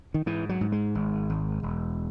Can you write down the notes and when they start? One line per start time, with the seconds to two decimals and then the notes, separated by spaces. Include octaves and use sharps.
0.14 D#3
0.26 G#2 E3
0.49 F#3
0.61 G#2
0.72 G#3
0.95 G#1
1.29 G#1
1.63 E1